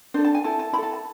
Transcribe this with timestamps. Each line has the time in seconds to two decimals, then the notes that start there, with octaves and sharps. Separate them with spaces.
0.14 D4 A4 C5
0.24 A5
0.35 G#5
0.44 E4 A4 A5
0.59 A5
0.73 E4 B5
0.78 A4 A5
0.93 A5